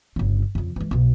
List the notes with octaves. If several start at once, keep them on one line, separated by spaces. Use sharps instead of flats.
G1 C#3
F2 C#3
E3 G#3
B1 B2